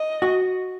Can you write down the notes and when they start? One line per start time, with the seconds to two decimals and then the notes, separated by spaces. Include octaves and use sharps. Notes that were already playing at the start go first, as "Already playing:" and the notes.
Already playing: D#5
0.22 F#4